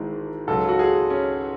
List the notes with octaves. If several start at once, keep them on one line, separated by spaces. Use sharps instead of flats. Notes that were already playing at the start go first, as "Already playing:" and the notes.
Already playing: G#1 G#2 E3 G#3
C#2 C#3 F#3 A4
F#4
G#4
C#4